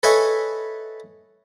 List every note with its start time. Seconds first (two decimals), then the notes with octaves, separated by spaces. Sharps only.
0.03 A4 B4 C#5 D#5 E5 G#5